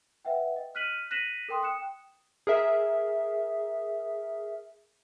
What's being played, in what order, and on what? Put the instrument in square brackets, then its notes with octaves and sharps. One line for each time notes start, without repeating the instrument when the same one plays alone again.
[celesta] B4 E5 F#5 G5
D#5
F6 F#6 B6 D#7 F#7
F#6 A#6 B6 D#7 E7 F#7
A4 A#4 G5 C6 D#6
G5 D#6 F#6 C#7 E7
[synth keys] G#4 A#4 E5